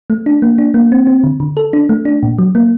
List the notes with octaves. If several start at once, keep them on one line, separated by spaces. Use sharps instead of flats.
A3
D4
A#3
D4
A#3
C4
C4
D3
D3
A4
D4
A3
D4
A#2
F#3
A#3